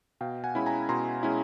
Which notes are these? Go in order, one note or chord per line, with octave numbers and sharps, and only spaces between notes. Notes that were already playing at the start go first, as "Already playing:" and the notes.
B2 F5 G5
F#5 G#5
G#3 C#4 E4 B5
G#5 A#5
B2 A#5 C6
G#3 C#4 E4